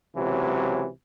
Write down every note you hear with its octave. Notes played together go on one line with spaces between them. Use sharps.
C#2 C3 E3 F#3